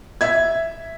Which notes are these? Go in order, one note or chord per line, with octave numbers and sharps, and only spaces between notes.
E5 G#6